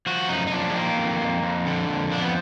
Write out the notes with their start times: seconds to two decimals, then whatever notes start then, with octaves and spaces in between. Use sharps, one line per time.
0.06 F3 F#4
0.29 F#2 D#4
0.47 D#4
0.52 F3 D4
0.70 G#3
0.75 D#3 A#3
0.97 F2
1.21 F2
1.43 F2
1.66 D3
1.88 F2
2.12 F3 D4
2.21 B3